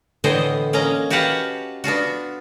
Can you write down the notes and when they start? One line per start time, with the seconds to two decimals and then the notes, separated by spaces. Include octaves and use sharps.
0.24 A2 D3 E3 B3 C5 D#5
0.73 A#3 C#4 D#5 A#5
1.10 F#4 G4 B4 F5 F#5 A5
1.84 B3 D4 F4 F#4